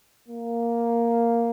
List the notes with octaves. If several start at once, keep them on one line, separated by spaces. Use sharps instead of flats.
A#3